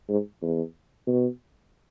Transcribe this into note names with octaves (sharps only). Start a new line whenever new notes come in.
G#2
E2
B2